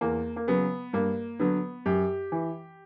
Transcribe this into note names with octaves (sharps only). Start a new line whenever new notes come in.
E2 A#3
A#3
C#3 F#3 B3
G2 A#3
D3 F#3 B3
F#2 G4
E3